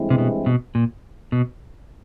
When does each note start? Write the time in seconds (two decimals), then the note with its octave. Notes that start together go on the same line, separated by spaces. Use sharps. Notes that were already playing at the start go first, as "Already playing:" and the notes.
Already playing: G2 E3 G#3 C4 E4
0.10 C3
0.18 B2
0.46 B2
0.75 A#2
1.32 B2